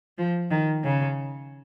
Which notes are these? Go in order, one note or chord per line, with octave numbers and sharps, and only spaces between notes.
F3
D#3
C#3